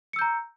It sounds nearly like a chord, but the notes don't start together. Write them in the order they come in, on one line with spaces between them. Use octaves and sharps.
C#7 E6 G6 A#5